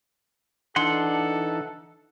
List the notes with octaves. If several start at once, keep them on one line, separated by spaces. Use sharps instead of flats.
E3 D4 D#4 A4 F#5 C6